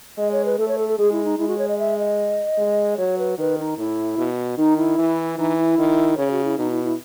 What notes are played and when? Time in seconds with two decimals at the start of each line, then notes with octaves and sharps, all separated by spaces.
0.18 G#3 D#5
0.31 C#5
0.45 B4
0.58 A3 A4
0.68 C#5
0.78 A4
0.89 A4
0.98 G#3 G#4
1.12 E4
1.24 D#4
1.38 G#3 E4
1.48 F#4
1.58 C#5
1.68 D#5
1.78 E5
1.98 D#5
2.58 G#3
2.97 F#3 C#5
3.18 B4
3.38 D#3 B4
3.58 D#4
3.78 A2 E4
4.18 B2
4.58 D#3 D#4
4.77 E4
4.98 E3
5.38 E3 D#4
5.57 E4
5.78 D#3
6.17 C#3 C#5
6.31 F#4
6.44 E4
6.57 B2 D#4
6.70 E4
6.84 E4